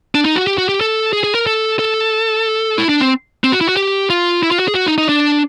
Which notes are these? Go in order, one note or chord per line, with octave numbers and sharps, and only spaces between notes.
D4
D#4
F#4
G4
F#4
G4
A4
G#4
G#4
A#4
A4
A4
E4
D4
C4
C4
F#4
E4
F#4
G4
F4
E4
F4
F#4
G#4
F#4
D#4
D#4
D4